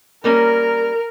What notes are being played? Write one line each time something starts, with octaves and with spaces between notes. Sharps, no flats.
G3 A#3 C#4 A#4